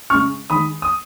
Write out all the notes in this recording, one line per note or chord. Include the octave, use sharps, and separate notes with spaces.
C#3 G#3 C#6 F6
D#3 G#3 B5 D#6
D#6